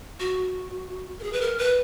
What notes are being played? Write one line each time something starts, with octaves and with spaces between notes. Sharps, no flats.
F#4
A#4
G#4
B4
A#4
B4